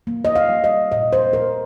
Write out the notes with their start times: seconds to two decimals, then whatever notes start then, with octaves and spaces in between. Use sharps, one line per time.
0.07 A#3
0.25 D#5
0.36 F5
0.49 G3
0.64 D#5
0.92 A#2 D#5
1.13 C5
1.33 A#2 A#4